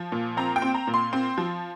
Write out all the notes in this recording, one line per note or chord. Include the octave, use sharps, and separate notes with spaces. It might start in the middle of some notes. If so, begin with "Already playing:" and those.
Already playing: F3
A#2
C4 A#5
G5
C4
A#5
A#2
C6
C4
F3